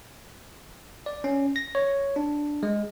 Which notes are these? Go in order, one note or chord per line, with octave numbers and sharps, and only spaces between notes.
D5
C#4
A#6
C#5
D4
G#3